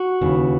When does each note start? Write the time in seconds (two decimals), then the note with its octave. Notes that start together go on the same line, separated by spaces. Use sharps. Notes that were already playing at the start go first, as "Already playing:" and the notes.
Already playing: F#4
0.21 D#2 C#3 E3